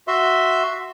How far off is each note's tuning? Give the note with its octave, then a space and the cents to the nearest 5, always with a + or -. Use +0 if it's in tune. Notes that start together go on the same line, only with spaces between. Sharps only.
F#4 +0 E5 +0 C6 +0